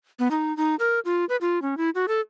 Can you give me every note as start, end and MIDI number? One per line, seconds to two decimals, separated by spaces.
0.19 0.28 59
0.31 0.55 63
0.57 0.75 63
0.79 0.99 70
1.05 1.25 65
1.29 1.36 71
1.41 1.62 65
1.62 1.77 61
1.77 1.90 64
1.95 2.06 66
2.08 2.20 69